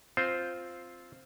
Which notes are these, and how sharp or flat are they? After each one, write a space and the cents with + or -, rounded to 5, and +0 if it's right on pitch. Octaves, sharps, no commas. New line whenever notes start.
C4 +0 F4 +0 C5 +0